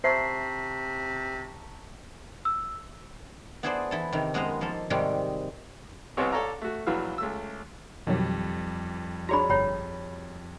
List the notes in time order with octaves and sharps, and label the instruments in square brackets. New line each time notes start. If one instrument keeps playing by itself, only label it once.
[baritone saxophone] C3 [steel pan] C5 E5 [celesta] A5 A#5 C#6 [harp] C7
[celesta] E6
[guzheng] B3 E4 G#4 A4 C5 D5
E3 E4 A4
C3 D#3
F#2 G#3 B3 B4 C5 A#5
F3 A#3 A4
G#2 C3 D#3 G3 G#3
[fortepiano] C2 C3 B3 C4 C#5 D#5
A4 C#5 D5 F5 A#5 D6
A3 F#4
A#1 E3 F#3 B4 F5
C#2 A3 E6
[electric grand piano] F2 G3 [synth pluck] B2 D#3 F#3
[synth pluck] D4 C#5 A#5 [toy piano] F#4 G#4 B5
[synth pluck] G1 A#5 [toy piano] C#5 G5 B5